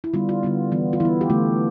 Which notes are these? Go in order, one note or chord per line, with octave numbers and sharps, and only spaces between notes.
E4
D3 G3 B3 F4
F4
D3 G3 B3
E3 B3
F4
E3 B3 E4
G4
D3 A3 F4